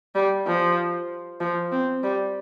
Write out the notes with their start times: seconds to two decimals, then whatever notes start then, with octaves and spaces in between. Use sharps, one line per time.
0.15 G3
0.47 F3
1.40 F3
1.72 C4
2.03 G3